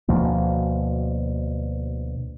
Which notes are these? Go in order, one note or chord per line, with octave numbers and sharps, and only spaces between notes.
D2 B2 F3 A#3